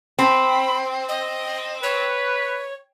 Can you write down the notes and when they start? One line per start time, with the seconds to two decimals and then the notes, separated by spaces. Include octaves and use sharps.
0.19 C4 B5
1.09 D#5
1.83 B4 C#5